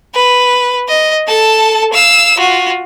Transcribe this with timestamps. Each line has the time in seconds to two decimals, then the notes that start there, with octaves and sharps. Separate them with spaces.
0.15 B4
0.89 D#5
1.28 A4 A5
1.94 F5 E6
2.38 F4 F#4